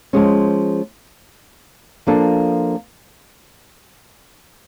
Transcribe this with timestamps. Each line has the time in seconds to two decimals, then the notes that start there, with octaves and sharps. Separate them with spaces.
0.13 F3 G#3 C#4
2.07 F3 A#3 D4 F4 A4